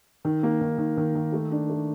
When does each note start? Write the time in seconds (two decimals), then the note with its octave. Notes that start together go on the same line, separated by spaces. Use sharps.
0.25 D#3
0.43 A#3
0.61 D#3
0.78 D#3
0.97 D#3
1.15 D#3
1.32 A3
1.51 D4
1.70 A3